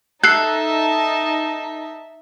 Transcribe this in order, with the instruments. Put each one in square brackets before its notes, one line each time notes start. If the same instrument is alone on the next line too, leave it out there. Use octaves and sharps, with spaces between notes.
[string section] D#4 [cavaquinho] A4 [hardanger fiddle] E5 A5 [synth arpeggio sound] F#6 C7